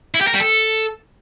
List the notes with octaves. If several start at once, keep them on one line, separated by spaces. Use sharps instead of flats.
E4
G4
A#4
G3
A4